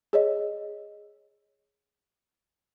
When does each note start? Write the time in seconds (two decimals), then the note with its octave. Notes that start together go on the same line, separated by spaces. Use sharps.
0.13 G#4 C#5 D#5